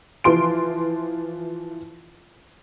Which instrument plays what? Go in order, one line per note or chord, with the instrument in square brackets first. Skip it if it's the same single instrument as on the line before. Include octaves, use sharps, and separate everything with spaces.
[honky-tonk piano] E3 F3 C6 D7